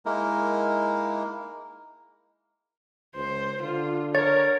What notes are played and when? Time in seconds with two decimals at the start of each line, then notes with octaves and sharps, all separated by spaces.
0.06 G#3 A#3 D#4 E4 A#4
3.15 C#2 C5
3.62 D3 F4
4.15 A#4 C#5 A6